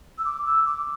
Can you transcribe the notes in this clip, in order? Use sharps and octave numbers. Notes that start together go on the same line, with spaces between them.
E6
D6
E6
D6